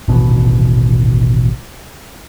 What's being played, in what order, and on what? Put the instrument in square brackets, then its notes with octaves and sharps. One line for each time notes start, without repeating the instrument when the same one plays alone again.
[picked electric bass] D#1 A1 D#2 B2